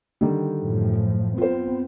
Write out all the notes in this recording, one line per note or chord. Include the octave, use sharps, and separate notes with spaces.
D3 D#3 G3
F#2 A2 F3
B3 C4 F4 C5